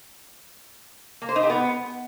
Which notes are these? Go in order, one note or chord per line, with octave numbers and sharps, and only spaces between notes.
A#3
C5
D#4
G4
B3